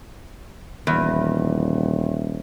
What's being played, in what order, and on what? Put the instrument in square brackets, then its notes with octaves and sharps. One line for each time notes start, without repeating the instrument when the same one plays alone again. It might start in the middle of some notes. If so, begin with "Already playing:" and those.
[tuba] D#1 [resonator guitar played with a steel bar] E2